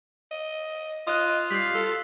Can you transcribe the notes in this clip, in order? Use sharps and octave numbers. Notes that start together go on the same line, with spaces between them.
D#5
F4 D#5 D#6 F#6
G3 B6 C7
A4 E6